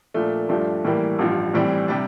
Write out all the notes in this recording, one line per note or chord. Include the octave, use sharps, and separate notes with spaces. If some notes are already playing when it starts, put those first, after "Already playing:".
A#2 F3 A3 D4
G2 F3 A3 D4 G4
A2 E3 G3 A#3
A1 G2 F3
A2 E3 G3 C4
C3 G3 D4